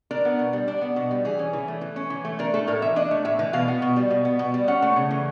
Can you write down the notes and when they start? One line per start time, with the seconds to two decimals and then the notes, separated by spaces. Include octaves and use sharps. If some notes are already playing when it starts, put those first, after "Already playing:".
0.11 D4 A#4
0.25 B3
0.39 B2
0.53 G3
0.68 D4
0.81 B3
0.96 B2
1.11 G3
1.25 E3 G#4
1.39 C#4
1.53 E3
1.68 A3
1.81 E3
1.96 C#4
2.10 E3
2.25 A3
2.39 D4 A#4
2.54 A3 A4
2.67 A2 A#4
2.82 E3 E5
2.96 D4 D#5
3.11 A3
3.25 A2 E5
3.39 E3
3.53 B2 F5
3.68 B3
3.82 B2
3.96 G3
4.10 B2
4.25 B3
4.39 B2
4.54 G3
4.68 C#4 F#5
4.82 A3
4.96 C#3
5.11 E3